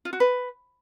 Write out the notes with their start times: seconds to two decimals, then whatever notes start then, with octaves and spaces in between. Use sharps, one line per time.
0.05 F4
0.13 F#4
0.20 B4